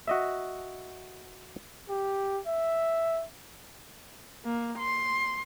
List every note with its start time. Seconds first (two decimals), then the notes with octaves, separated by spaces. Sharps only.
0.07 F#4 D#5 E5
1.89 G4
2.46 E5
4.45 A#3
4.79 C6